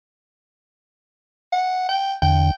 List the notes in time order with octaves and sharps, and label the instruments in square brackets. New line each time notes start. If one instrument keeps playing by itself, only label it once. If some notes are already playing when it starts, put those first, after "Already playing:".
[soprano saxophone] F#5
G5
[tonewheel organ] E2 D3 [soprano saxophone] G5